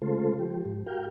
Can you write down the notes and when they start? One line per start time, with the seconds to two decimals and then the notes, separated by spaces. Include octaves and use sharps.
0.02 C#3 G#3 A3 F4 A4 C5
0.39 F3 G4
0.65 G#2
0.86 F#4 G4 A#4 F5 G5